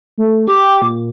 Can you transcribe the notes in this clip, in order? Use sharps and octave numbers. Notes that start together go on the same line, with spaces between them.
A3
G4 D6
A#2